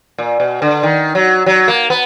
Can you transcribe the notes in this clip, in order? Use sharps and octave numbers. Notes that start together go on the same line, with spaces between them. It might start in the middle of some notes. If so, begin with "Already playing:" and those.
A#2
B2
D3
D#3
F#3
F#3
A#3
B3